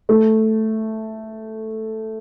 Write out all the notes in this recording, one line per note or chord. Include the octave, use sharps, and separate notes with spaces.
A3